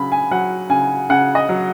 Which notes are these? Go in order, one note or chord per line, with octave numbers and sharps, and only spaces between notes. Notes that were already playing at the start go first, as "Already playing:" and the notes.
Already playing: C#3 F#3 B5
G#5
F#3 F#5
C#3 G#5
C#3 F#5
D#5
F#3